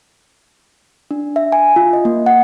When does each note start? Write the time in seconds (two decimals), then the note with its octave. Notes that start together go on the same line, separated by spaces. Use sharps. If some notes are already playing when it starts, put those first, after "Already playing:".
1.11 D4
1.36 E5
1.52 G#5
1.76 F4
1.93 D#5
2.05 A#3
2.26 F#5